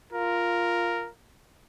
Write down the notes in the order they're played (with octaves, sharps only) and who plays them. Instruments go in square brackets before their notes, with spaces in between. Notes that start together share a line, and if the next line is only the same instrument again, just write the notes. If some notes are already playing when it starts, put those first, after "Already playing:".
[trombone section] F4 [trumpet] A#4